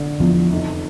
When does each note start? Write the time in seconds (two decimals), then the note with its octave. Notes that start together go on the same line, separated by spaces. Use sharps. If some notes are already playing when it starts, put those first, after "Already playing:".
Already playing: D3
0.20 E2 F3
0.51 F1